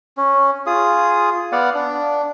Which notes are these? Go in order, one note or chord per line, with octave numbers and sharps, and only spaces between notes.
C#4
F4 G#4 D#6
B3 D5 F5 F#5
D4